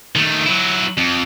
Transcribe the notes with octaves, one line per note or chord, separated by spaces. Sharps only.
D#3 A3
F#3 E4
F2